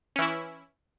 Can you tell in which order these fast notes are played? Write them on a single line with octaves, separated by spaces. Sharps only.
C#4 E3 E4